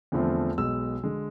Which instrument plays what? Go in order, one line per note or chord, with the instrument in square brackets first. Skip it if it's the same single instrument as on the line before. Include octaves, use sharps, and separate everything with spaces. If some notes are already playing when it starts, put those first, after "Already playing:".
[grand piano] E2 D3 F3 A3 C4
B1 B2 G#3 E6
D3 G#3